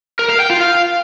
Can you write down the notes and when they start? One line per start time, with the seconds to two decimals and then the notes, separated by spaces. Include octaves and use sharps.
0.19 A#4
0.30 F5
0.40 G5
0.50 F4
0.61 F5